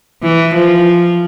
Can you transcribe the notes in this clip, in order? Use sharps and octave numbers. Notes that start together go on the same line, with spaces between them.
E3
F3